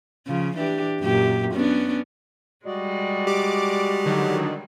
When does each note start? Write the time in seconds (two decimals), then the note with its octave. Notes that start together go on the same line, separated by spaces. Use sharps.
0.27 C#3 F3
0.57 E3 D4 G4
1.00 F#2 A#2 G4
1.53 B3 C#4 D4
2.66 G3 G#3 F#4 D5 D#5
3.27 G4 D6
4.05 D3 D#3 F#3